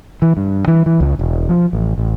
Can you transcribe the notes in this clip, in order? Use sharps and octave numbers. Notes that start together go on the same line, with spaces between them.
E3
G2
E3
E3
C#2
E1
F3
A1
A1